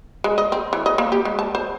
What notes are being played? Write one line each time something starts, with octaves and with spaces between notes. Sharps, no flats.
G#3
D#5
C4
E3
D#5
A#3
G4
G#3
A5
C5